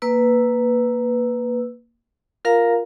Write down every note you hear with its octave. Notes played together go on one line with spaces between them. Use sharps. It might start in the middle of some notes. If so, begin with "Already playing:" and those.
A#3 B4 E6
F4 A#4 F5 A#5